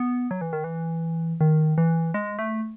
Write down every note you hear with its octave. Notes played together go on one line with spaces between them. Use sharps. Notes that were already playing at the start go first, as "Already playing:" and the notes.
Already playing: B3
F#3
E3
D#3
E3
D#3
E3
G#3
A3